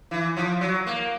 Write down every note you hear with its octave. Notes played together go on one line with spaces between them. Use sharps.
E3
F3
F#3
A#3